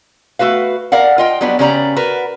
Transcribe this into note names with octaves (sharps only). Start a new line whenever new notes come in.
A3 F#4 B4 F5
A#4 D5 F5 F#5
F4 D#5 G5
F#3 G3 B3 D4 F#4
C#3 B3 C#4 G4 D5 A#5
F#4 A#4 B4